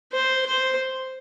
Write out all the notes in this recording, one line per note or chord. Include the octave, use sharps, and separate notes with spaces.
C5
C5